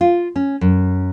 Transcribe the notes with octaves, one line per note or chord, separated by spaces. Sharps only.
F4
C#4
F#2